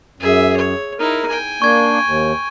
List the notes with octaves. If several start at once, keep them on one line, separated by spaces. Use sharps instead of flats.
F#2 G#4 E5
C#5
D#4 E4 A#4
G5 G#5
A#3 D4 C#6 G#6
D#2